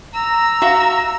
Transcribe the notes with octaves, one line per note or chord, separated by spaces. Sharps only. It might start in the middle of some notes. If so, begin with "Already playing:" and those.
A#5 E6
F#4 E5 F5